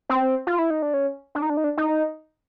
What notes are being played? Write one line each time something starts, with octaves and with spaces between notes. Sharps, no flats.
C4
F4
E4
D#4
D4
C#4
D4
D#4
D4
D#4
D4
D#4